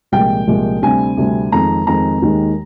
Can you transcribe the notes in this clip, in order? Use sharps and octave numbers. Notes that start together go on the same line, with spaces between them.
C2 A#2 F3 G#3 G5
C2 A#2 F3 G#3
D2 C3 G3 C4 G#5
D2 C3 G3 C4
F2 D#3 G#3 C4 A#5
F2 D#3 G#3 C4 A#5
D#2 D#3 G#3